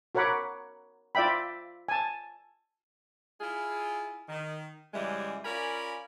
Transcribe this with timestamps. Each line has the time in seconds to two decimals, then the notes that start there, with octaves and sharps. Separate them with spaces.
0.15 F#4 A#4 C#5 F#5 B5 D6
1.15 F4 D5 E5 G5 B5
1.88 G#5 A5
3.41 E4 F4 G#4
4.29 D#3
4.93 F#2 C#3 E3 G3 G#3
5.45 C#4 F4 A#4 D5 G#5 B5